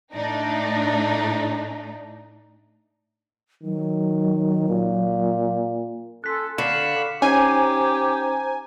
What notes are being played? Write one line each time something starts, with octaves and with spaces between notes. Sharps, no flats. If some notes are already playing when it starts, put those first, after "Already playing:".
A2 D4 D#4
D#3 F#3
A#2
C#4 F4 A4 F#6 B6
D3 F5 F#5 B5 C#6 E7
C#4 D#4 G4 C5 G#5 A#5